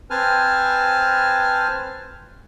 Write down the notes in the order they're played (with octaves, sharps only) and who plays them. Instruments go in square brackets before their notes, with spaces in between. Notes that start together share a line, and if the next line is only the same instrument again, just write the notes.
[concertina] C4 B4 C5 G#5 A5 F6